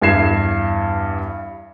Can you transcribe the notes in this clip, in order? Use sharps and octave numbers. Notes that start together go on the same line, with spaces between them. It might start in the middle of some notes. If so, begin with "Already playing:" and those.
E2 G2 E5 G#6 C7 E7